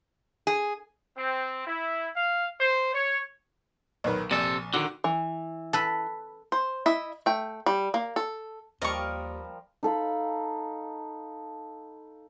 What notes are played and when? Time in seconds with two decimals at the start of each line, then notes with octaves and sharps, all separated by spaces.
0.47 G#4
1.17 C4
1.65 E4
2.15 F5
2.60 C5
2.93 C#5
4.04 B1 D#3 B4
4.31 A#1 C3 A4
4.74 D3 D#3 F#4
5.04 E3
5.73 A4 B4
6.52 C5
6.86 E4 D#5 E5
7.26 A3 G5
7.66 G3
7.94 A#3
8.16 A4
8.82 D#2 F3 G3 A#4 D5 D#5 F5 C#6
9.83 D#4 A4 F5 B5